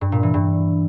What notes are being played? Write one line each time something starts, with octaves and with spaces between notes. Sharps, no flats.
G2
A#2
E3
G2